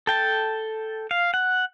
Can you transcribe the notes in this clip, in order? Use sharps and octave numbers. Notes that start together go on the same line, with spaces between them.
A4 G5 A5
F5
F#5